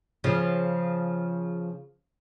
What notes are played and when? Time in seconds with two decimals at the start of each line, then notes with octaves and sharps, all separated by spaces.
0.24 C#3 F3